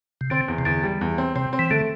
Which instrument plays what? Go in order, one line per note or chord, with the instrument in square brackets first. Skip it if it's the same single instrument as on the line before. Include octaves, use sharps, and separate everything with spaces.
[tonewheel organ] C3
[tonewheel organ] D3 [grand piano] C4
[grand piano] E2
[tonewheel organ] C3
[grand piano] E2 [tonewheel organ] D3
[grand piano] G3
E2
C4
[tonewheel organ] C3 [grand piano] C4
[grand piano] C4
[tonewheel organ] E3
[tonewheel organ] D3 [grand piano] A3